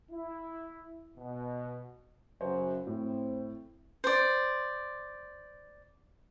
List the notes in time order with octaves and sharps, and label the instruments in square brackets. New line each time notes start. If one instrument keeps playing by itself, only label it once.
[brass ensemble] E4
B2
[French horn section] F#2 C#3 F#3 [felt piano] C5 C#5
[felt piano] A2 [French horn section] C4 E4
[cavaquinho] C5 D5